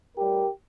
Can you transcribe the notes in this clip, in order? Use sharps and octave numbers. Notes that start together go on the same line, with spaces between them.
A2 G3 G4 A#4